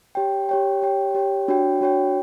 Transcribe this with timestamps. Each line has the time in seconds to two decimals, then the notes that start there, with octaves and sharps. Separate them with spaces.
0.15 G4 C#5 G5
0.49 G4 C#5 G5
0.82 G4 C#5 G5
1.14 G4 C#5 G5
1.48 D4 F#4 C#5 G5
1.81 D4 F#4 C#5 G5